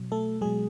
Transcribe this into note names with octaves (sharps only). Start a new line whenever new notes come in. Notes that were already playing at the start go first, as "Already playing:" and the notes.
Already playing: B2 F#3
A3 A4
B2 F#3 G#3 G#4